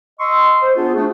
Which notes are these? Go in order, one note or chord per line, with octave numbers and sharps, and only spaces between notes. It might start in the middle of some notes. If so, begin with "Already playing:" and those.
D#5 C6 C#6 E6
C5
B3 D4 F4 G#4
A3 D4 F#4